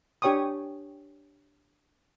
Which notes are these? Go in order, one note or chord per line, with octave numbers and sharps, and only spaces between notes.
D4 G4 C#5 G5 C#6 D#6